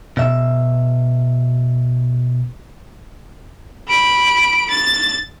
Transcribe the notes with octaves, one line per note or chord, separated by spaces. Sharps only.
B2 E5
B5 D7
A6